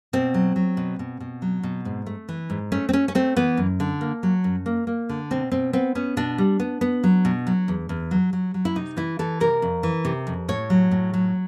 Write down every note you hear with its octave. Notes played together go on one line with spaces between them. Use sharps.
B2 C4
F#3
F#3
B2
B2
B2
F#3
B2
G#2
A3
E3
G#2
A3 C#4
C4
A3 C#4
C#4
A3 C4
E3 B3
F#2
D3
A#3
F#3
F#2
A#3
A#3
D3
B2 C4
B2 C4
B3 C4
B3 C#4
B2 D4
G3
B3
B3
F#3
B2
F#3
E2
E2
F#3
F#3
F#3
E4
C3 D#4
E3 E4
E3 A4
C3 A#4
F2
E3
C3
F2
A2 C#5
F#3
A2
F#3